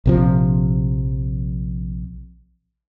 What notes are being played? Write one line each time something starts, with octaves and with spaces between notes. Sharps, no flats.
A#1 C3 F3